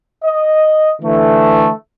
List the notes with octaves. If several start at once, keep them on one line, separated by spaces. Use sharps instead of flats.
D#5
D3 E3 A3